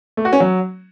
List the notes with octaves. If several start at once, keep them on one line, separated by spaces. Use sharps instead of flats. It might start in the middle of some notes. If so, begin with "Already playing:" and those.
A3
F#4
C#4
F#3